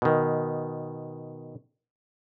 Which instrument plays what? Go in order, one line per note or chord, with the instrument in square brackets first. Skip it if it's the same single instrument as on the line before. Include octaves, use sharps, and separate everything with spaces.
[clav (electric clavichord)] B2 D#3